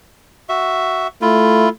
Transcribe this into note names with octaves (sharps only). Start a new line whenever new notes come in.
F#4 E5
A3 E4 F4